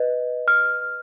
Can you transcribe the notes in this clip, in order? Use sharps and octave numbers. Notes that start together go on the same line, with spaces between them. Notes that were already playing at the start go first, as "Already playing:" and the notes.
Already playing: B4 D#5
F6